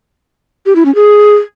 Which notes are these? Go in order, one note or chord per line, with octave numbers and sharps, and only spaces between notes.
G4
E4
C#4
G#4